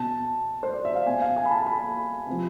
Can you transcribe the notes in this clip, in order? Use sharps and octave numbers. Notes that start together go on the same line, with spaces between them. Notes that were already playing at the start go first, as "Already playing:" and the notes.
Already playing: B2 A5
C5
D5
E5
F5
B2 G#5
F5
G#5
B5
A5
A5
B5
C3 F3